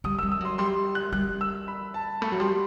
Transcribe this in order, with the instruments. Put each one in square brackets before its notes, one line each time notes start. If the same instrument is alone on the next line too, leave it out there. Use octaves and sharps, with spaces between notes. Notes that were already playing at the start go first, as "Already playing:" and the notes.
[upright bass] G3 [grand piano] D#6
[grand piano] E6
[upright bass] G3
[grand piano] E6
[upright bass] F#3 [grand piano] C6
[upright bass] G3 [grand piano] C6
[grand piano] F#6
[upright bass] G3 [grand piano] F#6
[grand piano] E6
B5
A5
[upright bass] A3 [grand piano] B5
[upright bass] F#3
[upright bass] G3 [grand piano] C6